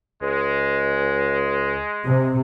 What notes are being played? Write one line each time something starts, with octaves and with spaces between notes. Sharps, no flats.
C#2 G#3
C3